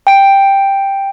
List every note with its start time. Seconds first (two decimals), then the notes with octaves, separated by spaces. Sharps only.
0.07 G5 D7